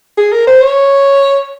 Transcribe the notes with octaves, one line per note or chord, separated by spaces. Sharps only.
G#4
A#4
C5
C#5